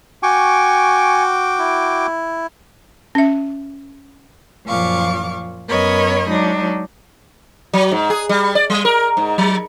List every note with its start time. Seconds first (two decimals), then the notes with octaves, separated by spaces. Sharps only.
0.23 F#4 G5 G#5 C#6 D6
1.59 E4
3.15 C#4 E5
4.65 F#2 A#2 F3 F5 C#6 D6
5.68 F#2 B3 A#4 C#5 D#5 B5
6.28 F#3 G#3 D4 D#4
7.73 F#3
7.92 G#2
8.10 G#4
8.29 G3
8.55 D5
8.70 G3
8.85 A#4
9.17 G#2
9.38 F#3